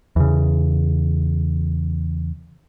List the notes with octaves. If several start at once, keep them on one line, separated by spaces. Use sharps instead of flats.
E2 C#3